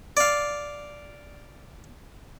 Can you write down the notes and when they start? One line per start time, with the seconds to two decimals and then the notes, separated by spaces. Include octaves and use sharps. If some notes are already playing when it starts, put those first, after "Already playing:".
0.17 D5 F5